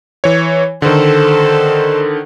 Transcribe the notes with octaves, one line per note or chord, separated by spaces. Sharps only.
E3 C#5
D3 D#3 A4 C5